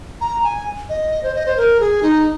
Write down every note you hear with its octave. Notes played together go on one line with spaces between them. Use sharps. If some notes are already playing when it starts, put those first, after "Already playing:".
A#5
G#5
D#5
C5
D#5
C5
A#4
G#4
D#4